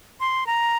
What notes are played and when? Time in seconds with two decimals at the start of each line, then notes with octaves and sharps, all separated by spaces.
0.20 C6
0.47 A#5